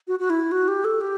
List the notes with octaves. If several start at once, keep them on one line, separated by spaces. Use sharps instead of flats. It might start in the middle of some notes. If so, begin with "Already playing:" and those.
F#4
F#4
E4
F#4
G4
A4
G4